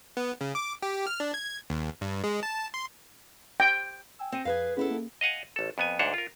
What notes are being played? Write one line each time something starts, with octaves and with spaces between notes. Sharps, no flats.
B3
C#3
D6
G4
F6
D4
G#6
D#2
G2
G#3
A5
C6
G5
G5 G#5 E6
C4 A#6 C#7 D#7
F2 G#4 B4 F5
B3 C#4 E4 G#4 A4
A#3
D#5 F5 F#5 G#5
A1 A4
F2 B3 G#5
D2 G#2 D4 C5 C#5 F#5
F4 A#4